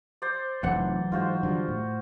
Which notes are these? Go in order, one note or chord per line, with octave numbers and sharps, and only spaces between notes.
C5 D5
F1 A2 E3 F#3 F#5
G#2 F4 F#4 C5
D3 F3 G3
A2